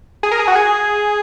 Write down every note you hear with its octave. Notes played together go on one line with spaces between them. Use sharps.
G#4
A#4
G#4
F#4
G#4